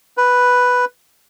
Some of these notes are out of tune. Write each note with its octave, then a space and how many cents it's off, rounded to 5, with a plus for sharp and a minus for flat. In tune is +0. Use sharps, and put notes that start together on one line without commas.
B4 +0